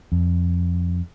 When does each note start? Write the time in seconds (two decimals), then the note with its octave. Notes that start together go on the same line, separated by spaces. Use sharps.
0.12 F2